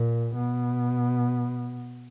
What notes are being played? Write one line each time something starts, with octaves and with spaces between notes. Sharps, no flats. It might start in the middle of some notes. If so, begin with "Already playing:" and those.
Already playing: A#2
B2